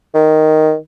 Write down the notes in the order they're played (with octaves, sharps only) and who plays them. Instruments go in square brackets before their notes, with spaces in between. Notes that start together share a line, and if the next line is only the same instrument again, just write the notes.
[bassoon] D#3